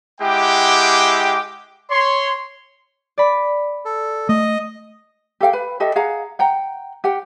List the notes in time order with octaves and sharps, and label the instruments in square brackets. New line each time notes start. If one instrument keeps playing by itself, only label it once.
[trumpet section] G#3 E4 G4 F#5 G5 D6
C#5 C6
[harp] D5 B5
[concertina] A4
[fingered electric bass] A3 [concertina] D#5 D#6
[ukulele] G4 A4 F5 G5
B4 B5
G4 A4 D#5 E5
G#4 F5 F#5 A#5
F#5 G5 A#5
G4 F#5 G5